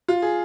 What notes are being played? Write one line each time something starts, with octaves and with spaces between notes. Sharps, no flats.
F4
G#4